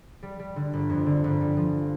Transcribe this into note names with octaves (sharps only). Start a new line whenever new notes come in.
G3
G3
D3
G1
F2
D3
G1
G3
F3